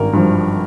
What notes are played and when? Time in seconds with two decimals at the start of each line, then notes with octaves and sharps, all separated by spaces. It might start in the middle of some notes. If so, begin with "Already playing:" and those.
Already playing: G#1 G2 A#4
0.13 G2 F3